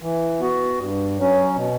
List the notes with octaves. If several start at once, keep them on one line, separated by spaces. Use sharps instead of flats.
E3
B3 F#4
G2
F#3 C#4
B2